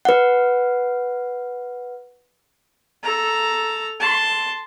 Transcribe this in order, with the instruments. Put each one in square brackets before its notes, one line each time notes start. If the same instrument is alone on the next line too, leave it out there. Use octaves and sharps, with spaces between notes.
[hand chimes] B4 F#5
[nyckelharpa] A4 A#5
A5 C6